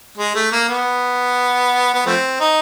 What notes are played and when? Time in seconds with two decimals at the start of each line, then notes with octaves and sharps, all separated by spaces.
0.18 G#3
0.35 A3
0.52 A#3
0.69 B3
1.94 B3
2.06 F3 A3 C4
2.40 D#4